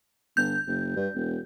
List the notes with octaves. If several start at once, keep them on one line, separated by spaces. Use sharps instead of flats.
G1 G6
F#1
G2
E1